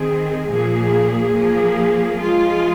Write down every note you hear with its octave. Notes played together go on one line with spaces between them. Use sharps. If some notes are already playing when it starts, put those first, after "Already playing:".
Already playing: D#3 C4 G#4
A#2 F3 A#3 G#4
F3 A#3 G#4
F3 G#3 F4 G#4